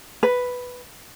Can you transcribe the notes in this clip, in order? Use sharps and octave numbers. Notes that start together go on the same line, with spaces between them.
B4